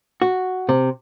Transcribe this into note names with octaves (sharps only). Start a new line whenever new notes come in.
F#4
C3